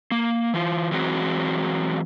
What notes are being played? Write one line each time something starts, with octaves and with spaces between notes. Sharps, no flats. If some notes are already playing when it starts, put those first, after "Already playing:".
A#3
E3 F4
E3 F#3 G#3 C4 F#4